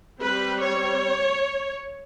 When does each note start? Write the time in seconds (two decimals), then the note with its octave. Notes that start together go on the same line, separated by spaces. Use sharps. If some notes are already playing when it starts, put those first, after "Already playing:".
0.20 G3 C4 B4
0.61 C#5